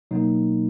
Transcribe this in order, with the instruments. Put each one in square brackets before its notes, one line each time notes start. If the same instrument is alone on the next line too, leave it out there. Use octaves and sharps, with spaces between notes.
[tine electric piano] B2 F#3 A#3 D#4